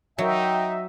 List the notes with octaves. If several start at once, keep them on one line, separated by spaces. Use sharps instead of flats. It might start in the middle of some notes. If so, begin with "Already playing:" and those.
F#3 D#4 E5 G5